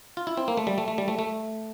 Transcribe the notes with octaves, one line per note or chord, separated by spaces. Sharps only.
F4
E4
C4
A#3
A3
G3
A3
A3
G3
A3
A3